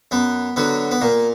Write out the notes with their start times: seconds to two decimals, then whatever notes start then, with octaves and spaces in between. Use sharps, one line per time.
0.11 F#2 B3
0.56 D3 F#3 B3
0.91 B3
1.01 A#2 A#3